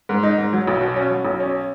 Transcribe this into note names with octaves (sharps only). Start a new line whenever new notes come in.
G#2
D#4
G#2
F#3
B1
B2
C#4
F#3
B1
C#4